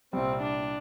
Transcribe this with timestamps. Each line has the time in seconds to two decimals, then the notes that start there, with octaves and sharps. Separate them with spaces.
0.13 C2 A#2 G3 C4
0.43 D4